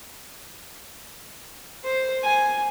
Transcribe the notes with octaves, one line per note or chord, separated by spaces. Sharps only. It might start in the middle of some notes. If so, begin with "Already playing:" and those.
C5
G#5